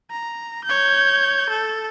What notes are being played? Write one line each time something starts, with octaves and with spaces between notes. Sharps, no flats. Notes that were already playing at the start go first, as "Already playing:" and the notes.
A#5
C#5 G6
A4